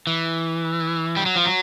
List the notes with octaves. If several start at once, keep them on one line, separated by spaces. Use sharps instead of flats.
E3
G3
F#3
F3
F#3